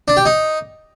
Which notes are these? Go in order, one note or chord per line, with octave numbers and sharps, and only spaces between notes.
D4
G4
D#4